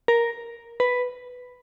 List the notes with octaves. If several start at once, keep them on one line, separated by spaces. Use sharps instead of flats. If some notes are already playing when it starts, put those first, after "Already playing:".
A#4
B4